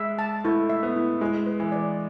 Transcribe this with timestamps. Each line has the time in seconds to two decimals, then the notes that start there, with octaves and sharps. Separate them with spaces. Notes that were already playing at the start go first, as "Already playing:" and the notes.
Already playing: G#3 E5
0.19 A5
0.44 A3 E4
0.69 E5
0.83 B3
0.96 E4
1.21 G#3 E4
1.46 B4
1.60 E3
1.72 D5